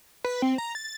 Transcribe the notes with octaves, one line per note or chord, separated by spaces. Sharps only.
B4
C4
A#5
A6